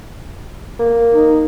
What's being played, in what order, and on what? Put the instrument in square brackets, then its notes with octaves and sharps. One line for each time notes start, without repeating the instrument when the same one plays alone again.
[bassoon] A#3
[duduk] D#4